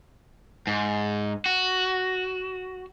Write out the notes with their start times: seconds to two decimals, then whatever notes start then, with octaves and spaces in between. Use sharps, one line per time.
0.67 G#2
1.46 F#4